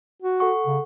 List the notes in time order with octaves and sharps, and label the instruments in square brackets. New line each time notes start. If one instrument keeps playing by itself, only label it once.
[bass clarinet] F#4
[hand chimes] A4 F#5 C#6
[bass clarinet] C#3